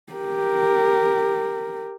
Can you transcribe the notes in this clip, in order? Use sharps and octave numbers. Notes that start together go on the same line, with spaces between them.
G4 A#4